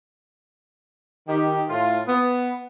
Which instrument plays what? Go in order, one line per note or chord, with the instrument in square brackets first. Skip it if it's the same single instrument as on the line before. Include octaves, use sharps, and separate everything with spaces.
[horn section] D#3 G4
A2 F4
B3